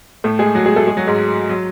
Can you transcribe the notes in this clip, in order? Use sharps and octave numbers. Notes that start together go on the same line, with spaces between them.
A2 A3
G#3 G#4
F#3 F#4
G#3 G#4
A3 A4
G#3 G#4
F#3 F#4
G#2 G#3
F#3